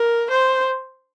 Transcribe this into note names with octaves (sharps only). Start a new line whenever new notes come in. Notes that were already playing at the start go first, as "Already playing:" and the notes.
Already playing: A#4
C5